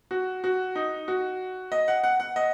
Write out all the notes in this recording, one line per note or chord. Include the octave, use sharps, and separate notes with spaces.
F#4
F#4
D#4
F#4
D#5
F#5
F#5
F#5
D#5